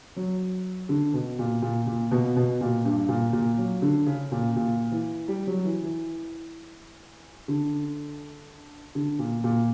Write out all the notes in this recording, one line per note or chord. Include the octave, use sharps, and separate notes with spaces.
F#3
D3
B2
A#2
A#2
A#2
B2
B2
A#2
G2
A#2
A#2
F#3
D3
C#3
A#2
A#2
E3
G3
F#3
E3
E3
D3
D3
A#2
A#2